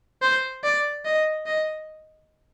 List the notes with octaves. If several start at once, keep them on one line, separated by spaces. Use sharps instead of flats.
C5
D5
D#5
D#5